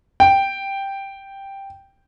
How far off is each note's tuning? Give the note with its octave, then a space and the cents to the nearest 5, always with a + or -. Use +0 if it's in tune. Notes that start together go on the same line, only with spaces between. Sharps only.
G5 +0